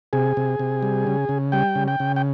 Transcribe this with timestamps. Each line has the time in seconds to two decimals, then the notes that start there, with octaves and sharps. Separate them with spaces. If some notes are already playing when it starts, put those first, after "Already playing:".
0.13 C3 G#4
0.37 C3
0.59 C3
0.83 G3
1.07 C#3
1.29 C#3
1.52 G3 G5
1.75 C#3
1.88 G5
2.00 C#3
2.16 G5